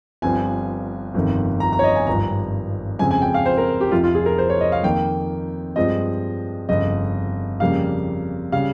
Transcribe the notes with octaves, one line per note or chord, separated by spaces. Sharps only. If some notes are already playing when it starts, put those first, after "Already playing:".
G1 G2 F3 C4 G#5
G1 F2 C3 D#3
A#5
A#5
C#5
D#5
G#5
G#1 G2 F3 A#5
F2 C#3 G#3 C4 G#5
G#5
G5
F5
C5
A#4
G4
F1 F2 C3 F3 F4
F4
G#4
A#4
C5
C#5
D#5
F5
F2 D#3 A#3 G5
G2 F3 G#3 C4 D#5
G1 F2 C#3 D#5
F2 C#3 G3 A#3 F5
C#3 G3 F5